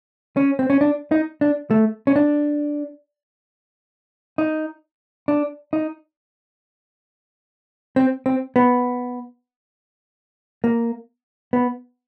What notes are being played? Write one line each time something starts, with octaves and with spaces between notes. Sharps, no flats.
C#4
C4
C#4
D4
D#4
D4
A3
C#4
D4
D#4
D4
D#4
C4
C4
B3
A#3
B3